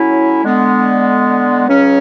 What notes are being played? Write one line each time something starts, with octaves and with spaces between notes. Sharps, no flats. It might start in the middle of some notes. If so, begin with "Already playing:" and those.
Already playing: A2 F#3 C#4 E4
D3 G#3 B3
C#2 C#3 F#3 C#4